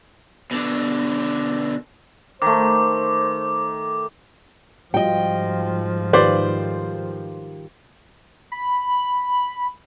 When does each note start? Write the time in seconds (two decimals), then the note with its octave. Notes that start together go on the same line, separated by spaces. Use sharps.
0.51 B2 D3
2.42 D#3 A3 C5 D6
4.94 G#2 F3 G3 F4 F#4 D#5 G5
6.13 D#3 F4 G4 B4 C5 D5
8.52 B5